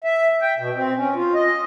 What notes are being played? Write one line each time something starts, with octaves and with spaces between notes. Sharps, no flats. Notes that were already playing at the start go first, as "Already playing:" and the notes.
E5
G5
B2
C4
C#4
F4
D#5